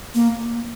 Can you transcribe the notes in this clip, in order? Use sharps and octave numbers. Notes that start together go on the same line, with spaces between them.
A#3